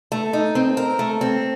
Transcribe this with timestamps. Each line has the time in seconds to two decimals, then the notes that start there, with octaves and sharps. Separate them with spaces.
0.12 A3
0.33 D#4
0.55 C4
0.77 A#4
0.99 A3
1.21 C4